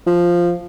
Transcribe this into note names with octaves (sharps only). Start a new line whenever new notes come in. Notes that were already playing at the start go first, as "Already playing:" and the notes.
F3